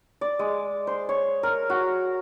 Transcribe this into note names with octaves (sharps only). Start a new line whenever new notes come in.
D5
G#3
C5
C#5
A#4
F#4